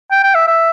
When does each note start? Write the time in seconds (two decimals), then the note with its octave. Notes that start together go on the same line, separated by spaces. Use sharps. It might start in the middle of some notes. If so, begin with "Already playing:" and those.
0.11 G5
0.24 G5
0.35 E5
0.47 E5